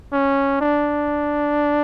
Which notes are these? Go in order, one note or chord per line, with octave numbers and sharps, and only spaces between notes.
C#4
D4